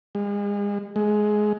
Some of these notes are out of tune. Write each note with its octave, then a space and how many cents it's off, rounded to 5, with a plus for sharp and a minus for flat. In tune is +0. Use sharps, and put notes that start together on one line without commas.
G#3 -35
G#3 +15